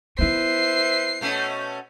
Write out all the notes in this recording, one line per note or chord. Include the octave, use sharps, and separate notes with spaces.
B3 E4 B4 C5 E5 C7
B2 A3 C#4